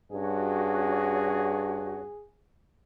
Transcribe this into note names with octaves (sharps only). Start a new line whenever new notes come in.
G2 C#4 F#4 G#4 C#5